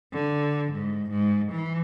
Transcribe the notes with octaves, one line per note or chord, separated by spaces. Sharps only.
D3
G#2
G#2
E3